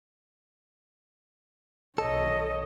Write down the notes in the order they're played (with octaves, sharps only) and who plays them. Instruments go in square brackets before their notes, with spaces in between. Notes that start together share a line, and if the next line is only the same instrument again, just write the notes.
[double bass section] B1 D#3 [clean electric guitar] A4 [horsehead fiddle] C#5 D#5